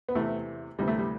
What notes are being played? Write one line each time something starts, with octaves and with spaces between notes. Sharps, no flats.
B3
E2 C3 E3 A3
D2 C3 E3 G3
A3
G3